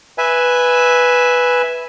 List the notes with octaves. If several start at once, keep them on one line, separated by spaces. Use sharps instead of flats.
B4 E5 G#5